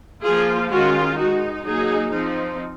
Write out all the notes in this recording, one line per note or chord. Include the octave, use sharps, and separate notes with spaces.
F3 A#3 F4 G#4
D#3 G#3 C#4 F4 F#4
G#3 D#4 F#4
F#3 A#3 D#4 G#4
F3 C4 D#4